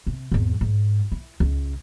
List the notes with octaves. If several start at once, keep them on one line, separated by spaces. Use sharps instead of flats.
C3
G#1 E2
G#2
E4
C#2